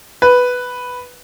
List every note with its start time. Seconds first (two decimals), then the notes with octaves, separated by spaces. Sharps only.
0.22 B4